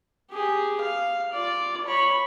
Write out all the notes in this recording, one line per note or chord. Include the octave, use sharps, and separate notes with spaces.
G4 G#4
F5
F4 D5
C#5 B5